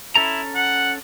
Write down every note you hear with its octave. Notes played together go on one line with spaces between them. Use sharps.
C#4 E4 A4 A#5
F#5